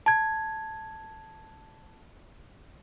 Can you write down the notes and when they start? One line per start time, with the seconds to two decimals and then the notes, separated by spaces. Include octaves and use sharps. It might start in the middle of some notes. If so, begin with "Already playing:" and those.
0.06 A5 G#6